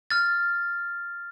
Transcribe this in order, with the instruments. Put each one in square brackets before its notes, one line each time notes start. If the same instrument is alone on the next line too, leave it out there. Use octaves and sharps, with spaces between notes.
[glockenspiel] F6 A6